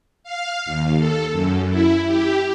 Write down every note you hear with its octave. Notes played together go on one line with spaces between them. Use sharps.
F5
D#2
A4
F#2
E4
G4